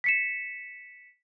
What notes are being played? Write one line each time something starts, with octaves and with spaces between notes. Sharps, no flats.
B6 C#7 E7